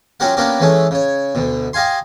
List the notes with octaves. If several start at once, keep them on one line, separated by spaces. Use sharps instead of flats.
F#3 C#4 F4 G4 A#4 F#5
A#3 B3 C#4 D4 G4 A#4
E3 G#3 A3 C#4
C#3 C#5
D2 B2
G4 D#5 F5 G#5 C6